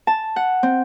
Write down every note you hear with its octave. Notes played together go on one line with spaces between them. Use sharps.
A5
F#5
C4